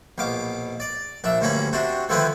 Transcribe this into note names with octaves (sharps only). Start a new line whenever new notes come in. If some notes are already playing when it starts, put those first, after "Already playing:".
A#1 B2 F5 D6
D5
A#1 D4 E5
D2 G2 A#3 C#4 A#5 B5
C3 D4 F#4 C5
D3 D#3 F3 C4 E4 B4